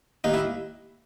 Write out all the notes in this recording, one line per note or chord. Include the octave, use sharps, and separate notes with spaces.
D#2 D#4
E4